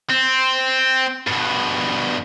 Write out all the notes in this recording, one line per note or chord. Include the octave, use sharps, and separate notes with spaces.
C4
G2 B2